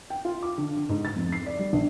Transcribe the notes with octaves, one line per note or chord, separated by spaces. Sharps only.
G5
F4
D6
D3
D3
G#2
A6
F2
C7
D5
G3
A#1